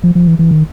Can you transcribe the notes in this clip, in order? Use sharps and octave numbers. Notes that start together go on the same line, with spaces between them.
F3
F3
E3
E3
D#3